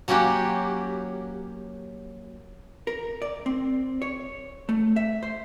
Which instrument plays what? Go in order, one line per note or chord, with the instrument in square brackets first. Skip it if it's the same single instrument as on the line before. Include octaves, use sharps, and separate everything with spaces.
[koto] F#3 A#3 C#4 F#4 G4
[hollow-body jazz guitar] A#4
D5
C4
C#5
A3
E5
C5